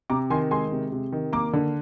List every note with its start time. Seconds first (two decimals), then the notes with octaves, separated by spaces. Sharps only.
0.10 C3 A#5 D6
0.30 D#3 G#5 C6
0.51 G#3 G#5 C6
0.72 C3
0.92 C3
1.12 D#3
1.33 A#3 A#5 D6
1.53 D3